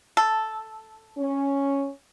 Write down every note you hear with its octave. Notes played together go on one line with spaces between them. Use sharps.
A4
C#4